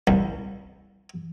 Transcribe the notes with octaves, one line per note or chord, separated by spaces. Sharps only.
C2